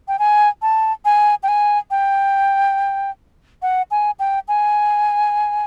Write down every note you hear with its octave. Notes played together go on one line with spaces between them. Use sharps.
G5
G#5
A5
G#5
G5
G#5
G5
F#5
G#5
G5
G#5